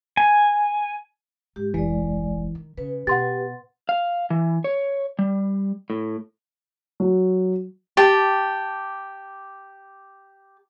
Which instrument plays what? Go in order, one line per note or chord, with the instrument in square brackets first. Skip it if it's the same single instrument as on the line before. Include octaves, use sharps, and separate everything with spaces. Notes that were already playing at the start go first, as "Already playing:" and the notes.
[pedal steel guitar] G#5
[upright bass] G#2 [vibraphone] G4
[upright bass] F1 A#1 [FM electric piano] E3 [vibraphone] G#3 D5
[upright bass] D#3
[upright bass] C#3 [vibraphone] B4
[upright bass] B2 [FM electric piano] G4 [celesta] F#5 C6 A6
[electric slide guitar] F5
E3
C#5
G3
A2
[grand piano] F#3
[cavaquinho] G4 A5